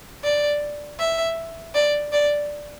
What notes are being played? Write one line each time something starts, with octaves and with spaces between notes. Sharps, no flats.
D5
E5
D5
D5